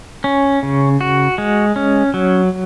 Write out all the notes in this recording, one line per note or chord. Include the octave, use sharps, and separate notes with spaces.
C#4
C#3
F#4
G#3
C#4
F#3